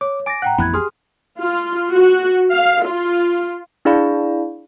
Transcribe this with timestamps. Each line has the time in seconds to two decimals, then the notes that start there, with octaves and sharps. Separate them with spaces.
0.01 C#5 D6
0.26 G#5 D6 A6 A#6 D7
0.42 A2 F#5 G5 A#5 F#6
0.58 A1 F2 B3 E4 B5 F#6 G#6
0.74 G4 G#4 C6 D#6 F6
1.41 F4
1.93 F#4
2.51 F5
2.86 F4
3.85 D4 E4 G#4 D5 F5 B5